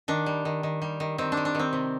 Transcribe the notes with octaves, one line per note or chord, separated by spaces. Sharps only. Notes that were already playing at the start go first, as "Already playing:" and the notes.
D#3 D4
G3
D#3
D#3
G3
D#3
D#3 C4
D4
G3
D4
D#3 C4
C3